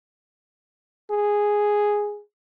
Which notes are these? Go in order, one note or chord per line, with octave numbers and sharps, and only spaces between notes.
G#4